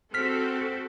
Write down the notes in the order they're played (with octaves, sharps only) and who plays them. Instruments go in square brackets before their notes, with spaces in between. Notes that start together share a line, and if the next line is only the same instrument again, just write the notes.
[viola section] C4 F#4 A4 [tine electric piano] F6 B6